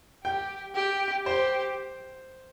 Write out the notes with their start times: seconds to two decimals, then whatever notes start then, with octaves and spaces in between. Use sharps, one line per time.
0.24 G4 G5
0.75 G4
1.26 G4 C5